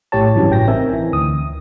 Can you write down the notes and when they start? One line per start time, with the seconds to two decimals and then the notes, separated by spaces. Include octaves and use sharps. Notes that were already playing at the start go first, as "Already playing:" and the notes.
0.12 A#1 A2 G4 C#5 A5
0.35 G2 C#3 E3 F#3 C#4
0.49 A1 E3 G5 A#6
0.67 C4 D#4 A#4 E5 G#5
0.93 E3
1.12 D2 D#6